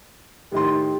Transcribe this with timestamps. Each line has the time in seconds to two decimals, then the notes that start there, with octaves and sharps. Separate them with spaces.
0.52 A2 D#3 G4 C6